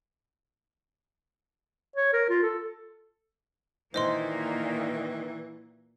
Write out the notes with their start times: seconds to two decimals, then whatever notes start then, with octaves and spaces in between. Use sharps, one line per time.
1.96 C#5
2.13 A#4
2.30 F4
2.43 A4
3.94 A#2 D#3 E3 A#3 C5 D#5 C6